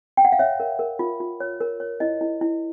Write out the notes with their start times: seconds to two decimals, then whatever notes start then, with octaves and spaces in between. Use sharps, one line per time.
0.17 G5
0.25 F#5
0.32 F5
0.39 C#5 E5
0.60 A#4
0.79 A#4
0.99 F4
1.20 F4
1.40 C#5
1.61 A#4
1.80 C#5
2.00 E4 D#5
2.21 E4
2.41 E4